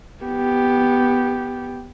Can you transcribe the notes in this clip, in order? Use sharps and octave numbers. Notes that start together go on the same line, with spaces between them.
B3 G4